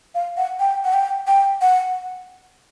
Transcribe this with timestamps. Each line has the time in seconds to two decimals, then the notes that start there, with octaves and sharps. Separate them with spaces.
0.15 F5
0.37 F#5
0.60 G5
0.84 F#5
0.93 G5
1.27 G5
1.61 F#5